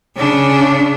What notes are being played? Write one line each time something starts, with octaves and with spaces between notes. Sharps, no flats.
C#3 D4